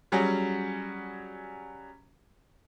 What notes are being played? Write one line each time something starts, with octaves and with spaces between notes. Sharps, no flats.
F#3 G3 C#4 F#4 G#4